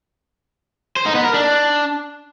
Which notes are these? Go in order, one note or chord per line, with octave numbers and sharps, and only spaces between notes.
C5
D#4
B3
A#4
D4